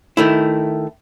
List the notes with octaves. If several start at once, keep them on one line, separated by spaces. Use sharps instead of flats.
D#3 A3 E4